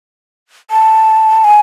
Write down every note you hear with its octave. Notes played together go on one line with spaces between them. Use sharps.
A5
G#5